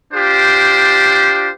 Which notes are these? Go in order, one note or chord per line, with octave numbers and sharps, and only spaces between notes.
D4 F4 G4 C5